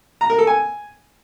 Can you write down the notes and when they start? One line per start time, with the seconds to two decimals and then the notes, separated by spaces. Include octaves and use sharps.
0.21 A#5
0.30 A#4
0.38 A4
0.47 G#5